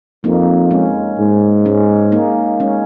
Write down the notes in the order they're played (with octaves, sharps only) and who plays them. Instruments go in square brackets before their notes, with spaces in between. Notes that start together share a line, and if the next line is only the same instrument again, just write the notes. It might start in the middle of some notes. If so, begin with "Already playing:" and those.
[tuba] F2 [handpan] A#3 D#4
[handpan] G#3 C#4
[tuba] G#2
[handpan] G#3 C#4
A#3 D#4
G#3 C#4